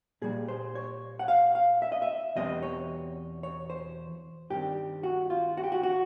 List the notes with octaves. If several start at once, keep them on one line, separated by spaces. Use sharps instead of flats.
A#2 G3 A#3 G#4
C5
C#5
F#5
F5
F5
E5
D#5
E5
E2 B2 G3 C4 D#5
C#5
C#5
C5
G2 D#3 G3 C4 G4
F#4
F4
F#4
G4
F#4
F#4